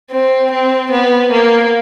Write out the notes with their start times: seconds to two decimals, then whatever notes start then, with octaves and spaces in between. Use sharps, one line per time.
0.11 C4
0.51 C4
0.91 B3
1.31 A#3